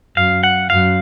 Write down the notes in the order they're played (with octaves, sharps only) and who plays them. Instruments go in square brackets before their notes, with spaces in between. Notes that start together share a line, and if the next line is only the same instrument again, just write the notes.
[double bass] F#2 [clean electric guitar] F5
[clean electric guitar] F#5
[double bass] F#2 [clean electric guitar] F5